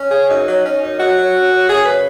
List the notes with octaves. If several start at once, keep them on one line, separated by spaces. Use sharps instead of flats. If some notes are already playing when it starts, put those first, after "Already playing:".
Already playing: C#4
C#3 G#4
F#2 D#4
F#3
C#4
F#2
F#2 F#4
F#3
C#4
F#2
F#2 G#4
C#3 B4